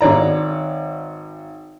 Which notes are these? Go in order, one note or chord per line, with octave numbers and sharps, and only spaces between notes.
G#1 C#5 D5 A#5